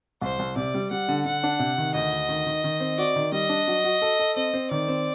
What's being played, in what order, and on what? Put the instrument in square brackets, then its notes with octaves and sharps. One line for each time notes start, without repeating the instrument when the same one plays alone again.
[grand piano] C2 [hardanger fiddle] C5
[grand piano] C2
[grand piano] C3 [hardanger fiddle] D5
[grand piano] G3
[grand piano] G3 [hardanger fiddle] F#5
[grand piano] D3
[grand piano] D3 [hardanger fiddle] F#5
[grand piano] D4
C3
D#3
[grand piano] D2 [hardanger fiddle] D#5
[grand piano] D2
D#3
D#3
D#3
C4
[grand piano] F#4 [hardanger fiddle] D5
[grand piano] D#3
[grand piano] G3 [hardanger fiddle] D#5
[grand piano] D4
F#3
F#4
A4
A4
[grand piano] C4 [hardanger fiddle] D#5
[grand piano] C4
[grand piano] D#3 [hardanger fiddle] D5
[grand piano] C4